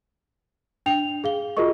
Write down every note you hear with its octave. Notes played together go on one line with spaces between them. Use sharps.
D4 G5 F7
G#4 F5 G7
F4 F#4 G#4 A#4 D#5 C#6